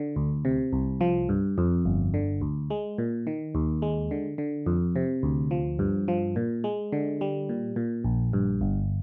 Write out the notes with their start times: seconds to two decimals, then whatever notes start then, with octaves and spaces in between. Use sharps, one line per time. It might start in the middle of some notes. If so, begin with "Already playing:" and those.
Already playing: D3
0.16 D2
0.45 C3
0.73 C2
1.01 F3
1.29 G2
1.58 F2
1.85 G1
2.14 D3
2.41 D2
2.70 G#3
2.98 A#2
3.27 D#3
3.55 D#2
3.82 G#3
4.11 D3
4.38 D3
4.66 F2
4.96 C3
5.23 D2
5.51 F3
5.79 G2
6.08 F3
6.36 A#2
6.64 G#3
6.92 D3
7.21 G3
7.49 A#2
7.76 A#2
8.04 A#1
8.33 G2
8.61 G1